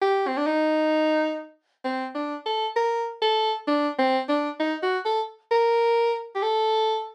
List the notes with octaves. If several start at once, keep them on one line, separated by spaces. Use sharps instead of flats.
G4
C4
D4
D#4
C4
D4
A4
A#4
A4
D4
C4
D4
D#4
F#4
A4
A#4
G4
A4